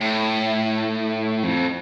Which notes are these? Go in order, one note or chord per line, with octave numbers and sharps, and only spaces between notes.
A2
F2